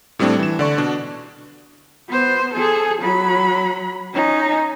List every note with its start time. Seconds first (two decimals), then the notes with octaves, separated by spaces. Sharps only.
0.19 A2 G3 A3 C4 D4
0.39 E3 E7
0.59 D3 D5 C#6
0.78 B2 D4
2.09 B3 C5
2.54 G#4 A4
3.02 F#3 B5
4.14 C#4 D#4